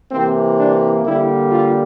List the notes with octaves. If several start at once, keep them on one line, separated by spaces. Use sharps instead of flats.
C3 E3 A#3 C4
D4
D3 G3 A#3 E4
F4